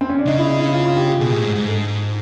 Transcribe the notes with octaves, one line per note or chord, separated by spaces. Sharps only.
C4
C#4
D4
C#3 D#4
E4
D#4
E4
F4
F4
G4
G4
B2 G#4
A2
G#2
G#2
A4